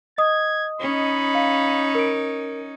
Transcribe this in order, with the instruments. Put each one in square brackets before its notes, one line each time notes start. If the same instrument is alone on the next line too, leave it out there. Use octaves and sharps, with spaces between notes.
[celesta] D#5 D#6 [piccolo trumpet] G#6
[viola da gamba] C#4 D#4 [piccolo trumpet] B5
[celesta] F5
A#4 D7